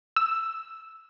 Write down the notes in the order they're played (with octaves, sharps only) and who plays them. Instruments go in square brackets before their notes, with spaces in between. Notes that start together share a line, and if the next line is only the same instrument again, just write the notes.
[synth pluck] E6